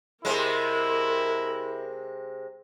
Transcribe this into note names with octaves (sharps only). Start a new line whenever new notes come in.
C3 G#3 E4 A#4